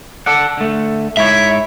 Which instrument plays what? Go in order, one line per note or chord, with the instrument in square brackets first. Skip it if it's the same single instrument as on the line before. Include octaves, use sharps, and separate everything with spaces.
[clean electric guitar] A4 D5 F#5
D3 A3
[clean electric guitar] G#2 E4 C#5 [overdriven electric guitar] E5